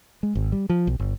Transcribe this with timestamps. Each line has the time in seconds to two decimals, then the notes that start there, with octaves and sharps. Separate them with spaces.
0.23 G#3
0.35 G#1
0.52 G3
0.69 F3
0.87 B1
0.99 G1